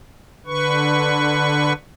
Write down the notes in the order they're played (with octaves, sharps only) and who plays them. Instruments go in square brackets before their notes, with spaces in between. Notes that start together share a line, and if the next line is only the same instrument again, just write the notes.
[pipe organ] D3 B4 C#6